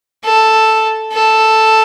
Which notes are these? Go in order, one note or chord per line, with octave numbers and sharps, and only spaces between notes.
A4
A4